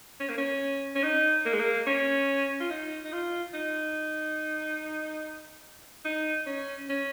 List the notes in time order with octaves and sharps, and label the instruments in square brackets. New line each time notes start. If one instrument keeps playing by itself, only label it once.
[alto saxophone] C#4
A#3
C#4
C#4
D#4
A#3
G#3
A#3
C#4
F4
D#4
D#4
F4
D#4
D#4
C#4
C#4